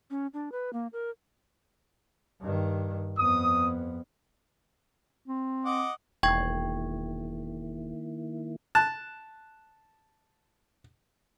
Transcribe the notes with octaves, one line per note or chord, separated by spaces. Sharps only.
C#4
D4
B4
A#3
A#4
G2 D#3
F2 B3 D#6
C4
D#5 F#5 D6
E1 D#3 A#3 E4 G5 C#6 G#6
A5 F#6